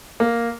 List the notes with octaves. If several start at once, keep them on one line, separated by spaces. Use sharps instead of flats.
A#3